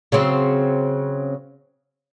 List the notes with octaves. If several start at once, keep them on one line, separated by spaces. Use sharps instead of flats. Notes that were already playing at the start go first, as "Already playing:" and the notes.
C#3 F#3 C4